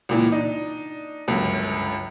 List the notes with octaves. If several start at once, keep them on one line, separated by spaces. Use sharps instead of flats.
C#2 A#2 E3
D4 D#4
G1 C#2 F#2